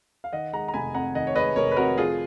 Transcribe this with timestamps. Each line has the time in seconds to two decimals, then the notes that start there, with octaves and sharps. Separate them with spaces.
0.24 F5
0.33 D#3 D#5 F#5
0.53 G#3 F#5 A#5
0.68 A#5
0.74 F1 G#5 B5
0.94 F2 F#5 A#5
1.15 D#3 D#5 F#5
1.27 C#5
1.35 G#3 B4 D#5
1.56 F1 A#4 C#5
1.72 B4
1.77 F2 F#4 A#4
1.98 F3 F4 G#4